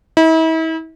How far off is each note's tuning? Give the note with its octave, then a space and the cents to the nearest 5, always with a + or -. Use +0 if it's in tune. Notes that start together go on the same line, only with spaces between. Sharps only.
E4 -40